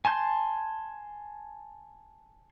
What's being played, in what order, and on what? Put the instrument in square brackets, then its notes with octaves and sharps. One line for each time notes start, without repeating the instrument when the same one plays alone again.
[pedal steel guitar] G#5 A5 C6 G6